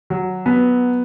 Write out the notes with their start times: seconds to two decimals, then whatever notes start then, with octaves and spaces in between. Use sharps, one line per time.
0.10 F#3
0.46 B3